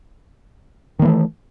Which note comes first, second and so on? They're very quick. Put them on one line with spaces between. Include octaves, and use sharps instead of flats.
D#3 A#3 E3 A3